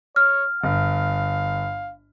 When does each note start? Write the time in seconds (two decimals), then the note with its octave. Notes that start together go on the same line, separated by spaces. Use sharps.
0.16 C#5 F6
0.64 G1 F5